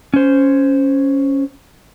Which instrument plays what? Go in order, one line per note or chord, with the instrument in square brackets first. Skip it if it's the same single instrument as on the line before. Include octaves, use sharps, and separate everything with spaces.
[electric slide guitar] C#4 C5